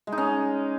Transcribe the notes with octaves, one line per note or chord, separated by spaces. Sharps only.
G#3
D#4
C#4